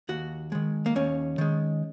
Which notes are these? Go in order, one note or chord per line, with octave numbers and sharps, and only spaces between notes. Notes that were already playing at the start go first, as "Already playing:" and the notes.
D#2 F#4
D#3 G#3
A#3
D#2 C#4
D#3 G#3